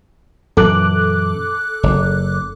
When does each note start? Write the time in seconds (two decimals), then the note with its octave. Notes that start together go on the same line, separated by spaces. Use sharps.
0.57 F#2 A#2 E3 A4 D6 F#6
1.83 F#1